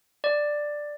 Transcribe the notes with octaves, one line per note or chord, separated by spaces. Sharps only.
D5